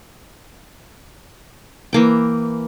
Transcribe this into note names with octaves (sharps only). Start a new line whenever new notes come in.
E3 A#3 G5